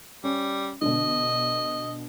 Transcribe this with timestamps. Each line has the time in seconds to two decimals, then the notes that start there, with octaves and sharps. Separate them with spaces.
0.24 G3 C#4
0.82 B2 D3 D#5